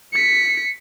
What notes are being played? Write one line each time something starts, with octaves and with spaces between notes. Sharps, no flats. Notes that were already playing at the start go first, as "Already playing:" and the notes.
B6 C#7